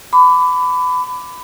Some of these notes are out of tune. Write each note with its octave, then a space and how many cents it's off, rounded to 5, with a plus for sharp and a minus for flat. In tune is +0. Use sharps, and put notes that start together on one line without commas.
B5 +25 D6 -5